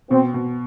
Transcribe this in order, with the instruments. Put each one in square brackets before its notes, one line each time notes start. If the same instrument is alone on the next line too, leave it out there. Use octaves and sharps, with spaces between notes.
[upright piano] B2 [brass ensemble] C4
[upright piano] B2